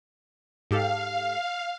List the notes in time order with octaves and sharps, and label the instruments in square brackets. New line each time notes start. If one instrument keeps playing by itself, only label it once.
[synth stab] G#2 G4 A4 [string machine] F5